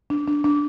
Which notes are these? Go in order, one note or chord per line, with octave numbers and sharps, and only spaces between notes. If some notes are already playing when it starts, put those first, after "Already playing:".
D4
D4
D4